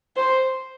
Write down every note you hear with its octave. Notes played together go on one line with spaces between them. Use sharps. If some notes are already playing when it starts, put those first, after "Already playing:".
C5